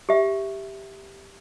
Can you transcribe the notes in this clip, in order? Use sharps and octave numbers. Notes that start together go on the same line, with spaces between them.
G4 E5